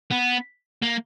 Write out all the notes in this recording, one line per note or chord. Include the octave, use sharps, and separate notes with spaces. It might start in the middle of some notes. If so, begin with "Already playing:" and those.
B3
A#3